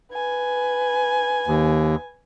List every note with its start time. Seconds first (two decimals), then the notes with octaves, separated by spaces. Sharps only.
0.13 B4 G#5
1.47 D#2